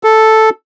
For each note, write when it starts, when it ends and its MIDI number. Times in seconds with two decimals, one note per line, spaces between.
0.04 0.50 69